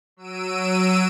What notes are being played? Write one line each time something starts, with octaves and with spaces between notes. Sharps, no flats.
F#3 E6 D7 D#7